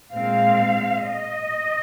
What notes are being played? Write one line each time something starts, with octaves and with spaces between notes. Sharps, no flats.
A#2 G#3 C4 F5
D#5